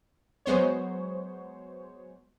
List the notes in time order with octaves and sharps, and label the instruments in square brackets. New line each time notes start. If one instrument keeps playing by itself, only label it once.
[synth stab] F#3 G#3 B3 C5 C#5